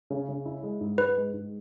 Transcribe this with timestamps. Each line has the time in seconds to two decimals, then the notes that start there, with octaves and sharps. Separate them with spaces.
0.10 C#3
0.29 C#3
0.46 E4
0.63 G#3
0.81 G#2
0.98 G#2 B4
1.16 G#3
1.34 G#2